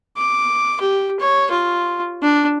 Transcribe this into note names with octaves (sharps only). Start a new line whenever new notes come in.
D6
G4
C#5
F4
D4